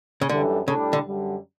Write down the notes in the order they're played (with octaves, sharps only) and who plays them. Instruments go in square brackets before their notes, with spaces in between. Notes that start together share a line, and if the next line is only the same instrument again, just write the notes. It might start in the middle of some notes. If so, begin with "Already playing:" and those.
[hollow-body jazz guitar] C#3
[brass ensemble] F#2 E3 G3 D4 A4 [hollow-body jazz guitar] D3
[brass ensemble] A2 G3 D4 A4 [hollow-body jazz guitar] C#3
[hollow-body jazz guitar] D3
[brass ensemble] F#2 D3 G3